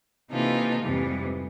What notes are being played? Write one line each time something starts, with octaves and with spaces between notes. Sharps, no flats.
C3 E3 A#3 D#4 F4 A4
F2 G#2 C3 E3 G3